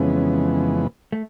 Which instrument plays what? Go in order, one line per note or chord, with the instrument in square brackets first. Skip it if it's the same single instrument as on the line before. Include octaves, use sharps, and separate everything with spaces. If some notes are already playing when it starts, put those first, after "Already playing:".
Already playing: [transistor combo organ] F2 C#3 E3 G#3 B3 [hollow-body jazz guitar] C#4
[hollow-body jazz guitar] A3